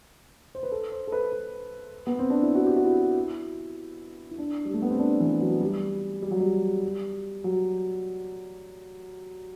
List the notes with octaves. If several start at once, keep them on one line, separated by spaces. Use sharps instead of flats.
C5
B4
A4
C5
A4
B4
B4
B3
C4
D4
E4
F#4
G4
F#4
E4
E4
D4
G3
A3
B3
C4
D4
E3
F#3
G3
G3
F#3
G3
F#3